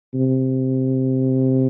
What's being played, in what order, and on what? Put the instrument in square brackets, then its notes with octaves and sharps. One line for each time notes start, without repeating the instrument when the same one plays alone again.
[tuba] C3